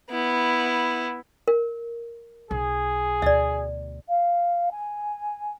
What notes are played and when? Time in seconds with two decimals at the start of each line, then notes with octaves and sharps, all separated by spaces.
0.10 B3 E4
1.48 A#4
2.51 B1 G#4
3.22 D2 B2 D5 E5
4.08 F5
4.71 G#5